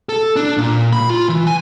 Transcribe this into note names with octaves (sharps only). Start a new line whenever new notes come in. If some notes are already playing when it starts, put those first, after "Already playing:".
A4
D4
A#2
B5
F4
E3
G#5